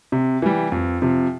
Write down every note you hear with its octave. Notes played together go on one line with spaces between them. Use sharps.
C3
E3 G3
F2
C3 F3